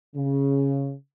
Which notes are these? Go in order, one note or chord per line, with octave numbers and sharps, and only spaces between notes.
C#3